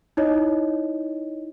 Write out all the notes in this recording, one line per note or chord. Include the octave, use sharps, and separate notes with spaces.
D#4 E4 C#5 D#5